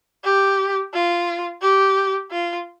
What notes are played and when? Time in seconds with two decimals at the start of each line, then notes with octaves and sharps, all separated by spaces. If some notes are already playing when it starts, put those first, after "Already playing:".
0.24 G4
0.93 F4
1.62 G4
2.31 F4